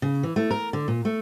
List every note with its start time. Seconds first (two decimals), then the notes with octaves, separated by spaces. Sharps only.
0.02 C#3
0.23 E3
0.36 A3
0.51 A#4
0.73 D3
0.88 A#2
1.05 A3